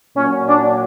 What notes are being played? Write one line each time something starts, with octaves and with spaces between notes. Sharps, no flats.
A#2 F#3 C#4
D4